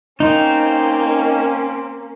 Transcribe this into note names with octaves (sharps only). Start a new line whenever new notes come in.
A#3 C4 C#4 D#4